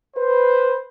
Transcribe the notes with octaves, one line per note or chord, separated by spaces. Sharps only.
B4 C5